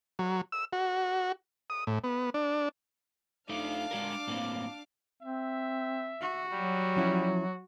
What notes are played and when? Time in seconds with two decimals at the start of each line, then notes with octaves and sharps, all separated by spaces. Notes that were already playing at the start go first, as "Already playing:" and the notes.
0.19 F#3
0.52 E6
0.73 F#4
1.70 D#6
1.87 A2
2.04 B3
2.34 D4
3.49 A3 D4 D#4 F5 D6
3.91 G#3 F#4 A#4
4.28 A2 A#3 C4
5.23 C4 E5
6.22 F#4
6.53 F#3 G3
6.96 F3 C#4 E4